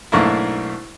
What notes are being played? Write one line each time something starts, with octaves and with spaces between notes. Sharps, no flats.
B1 G#2 A3 A#3 D4 E4